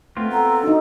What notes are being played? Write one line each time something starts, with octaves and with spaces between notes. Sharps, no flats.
A3 B3 C4 F4
A4 F#5 A#5
D4 D#4 F#4